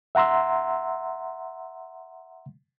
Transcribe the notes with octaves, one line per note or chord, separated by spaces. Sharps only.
E5 F#5 A#5 C6 E6